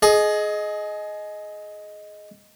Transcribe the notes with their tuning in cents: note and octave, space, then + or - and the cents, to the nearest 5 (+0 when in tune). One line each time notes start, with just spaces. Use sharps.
G#4 +25 D#5 +0